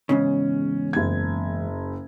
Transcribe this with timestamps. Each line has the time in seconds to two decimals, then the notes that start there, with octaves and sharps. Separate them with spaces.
0.09 E2 G#2 C#3 C#4
0.93 F#1 G#6